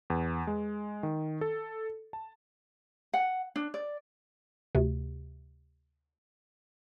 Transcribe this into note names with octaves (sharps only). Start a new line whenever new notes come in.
E2
G#3
D#3
A4
A5
F#5
D4
D5
D2 C3